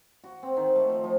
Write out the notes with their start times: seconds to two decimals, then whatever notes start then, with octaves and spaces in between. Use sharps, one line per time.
0.24 F#4
0.43 C4
0.57 D#3
0.76 A3
0.90 F3
1.04 F3